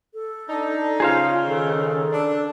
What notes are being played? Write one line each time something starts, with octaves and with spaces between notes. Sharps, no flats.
A4
D4 D#4
C#3 F4 G#4 C5 F5
D#3 A4
D4